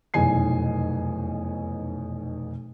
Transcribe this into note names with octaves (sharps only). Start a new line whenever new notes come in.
F1 B1 E2 B2 G#5 C7